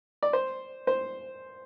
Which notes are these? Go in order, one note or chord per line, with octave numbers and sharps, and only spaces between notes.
D5
C5
C5